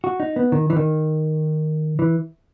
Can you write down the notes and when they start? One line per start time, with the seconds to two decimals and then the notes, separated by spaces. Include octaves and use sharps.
0.04 F#4
0.20 D#4
0.36 B3
0.52 D#3
0.70 E3
0.76 D#3
1.99 E3